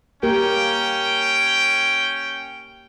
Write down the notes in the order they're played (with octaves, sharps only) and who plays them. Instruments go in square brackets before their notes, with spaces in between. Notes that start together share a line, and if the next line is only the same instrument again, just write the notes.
[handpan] A#3 G4 A#4 [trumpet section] C#4 G5